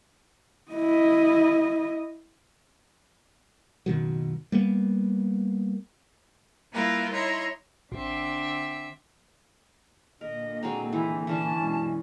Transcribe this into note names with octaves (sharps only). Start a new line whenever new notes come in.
E4 D#5
F#1 B2 D#3 F#3
G3 A#3 B3
G3 A#3 E4 F4 A#4 B4
D#4 E4 C#5 A#5 C6
A1 D3 C4 E5
A#2 D3 A#4 D#5
F#3 G#3 C4 A#5
E3 D#4 E4
E3 C#4 D4 A5
F#2 B2 G#3